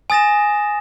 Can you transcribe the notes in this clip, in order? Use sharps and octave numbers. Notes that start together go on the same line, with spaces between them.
G#5 D#6 A6 A#6 E7